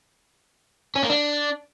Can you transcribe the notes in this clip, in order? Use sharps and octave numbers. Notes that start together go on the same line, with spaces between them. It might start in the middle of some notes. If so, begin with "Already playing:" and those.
C#4
A#3
D4